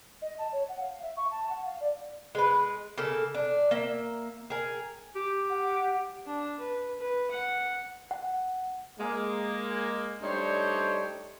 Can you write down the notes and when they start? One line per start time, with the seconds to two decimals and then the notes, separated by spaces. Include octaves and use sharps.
0.22 D#5
0.38 A5
0.52 C#5
0.69 F#5
0.81 F5
1.02 E5
1.17 C#6
1.31 A5
1.50 F#5
1.65 F5
1.81 D5
2.35 G#3 B4
2.98 C#3 A#3 A4
3.35 D4
3.71 A#3 E5
4.50 G#4 A#4
5.15 G4
5.50 F#5
6.26 D4
6.60 B4
6.99 B4
7.31 F#5
8.11 F#5
9.00 G#3 A#3
10.22 G3 A3 D4 D#4 C5 C#5